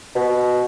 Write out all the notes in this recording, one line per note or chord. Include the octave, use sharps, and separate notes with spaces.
B2